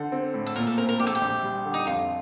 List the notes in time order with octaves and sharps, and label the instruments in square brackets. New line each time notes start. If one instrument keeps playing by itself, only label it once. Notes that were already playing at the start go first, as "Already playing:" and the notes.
Already playing: [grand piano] D3 [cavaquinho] C5
[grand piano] C4
A2
[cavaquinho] A4
[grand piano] A#2 [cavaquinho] A#4
[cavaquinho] A4
[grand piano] C4 [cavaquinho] A#4
[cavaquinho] A#4
[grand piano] A#1 [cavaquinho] G4
[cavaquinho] A4
G4
[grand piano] A#1
G3
D3
[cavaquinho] D#4
[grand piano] F2 [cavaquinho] F4